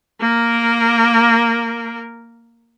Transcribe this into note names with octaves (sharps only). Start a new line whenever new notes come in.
A#3 A#4